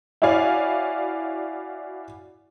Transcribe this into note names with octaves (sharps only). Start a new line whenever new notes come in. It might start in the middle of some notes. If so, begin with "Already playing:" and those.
E4 F#4 C#5 D5 F5 G#5